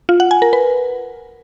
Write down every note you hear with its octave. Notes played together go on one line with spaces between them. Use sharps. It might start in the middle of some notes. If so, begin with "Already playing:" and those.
F4
F#5
G#5
A#4
B4